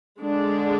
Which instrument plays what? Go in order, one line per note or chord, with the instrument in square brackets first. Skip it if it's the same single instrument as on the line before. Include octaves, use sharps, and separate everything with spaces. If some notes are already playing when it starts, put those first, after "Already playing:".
[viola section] D3 G#3 D4